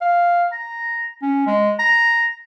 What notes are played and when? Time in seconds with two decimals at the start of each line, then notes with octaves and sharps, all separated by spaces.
0.01 F5
0.52 A#5
1.22 C#4
1.47 G#3
1.79 A#5